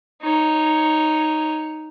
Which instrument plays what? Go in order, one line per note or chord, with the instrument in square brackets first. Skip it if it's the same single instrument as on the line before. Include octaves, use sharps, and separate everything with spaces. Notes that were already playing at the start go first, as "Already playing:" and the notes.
[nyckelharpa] D#4 C#5